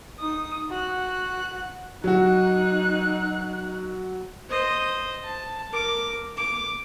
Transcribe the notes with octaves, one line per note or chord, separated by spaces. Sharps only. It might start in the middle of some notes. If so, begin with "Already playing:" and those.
D#4 D#6
F#4 F#6
F#3 D#4 F#4 F#6
C5 D#5
A5
A#4 D6
D6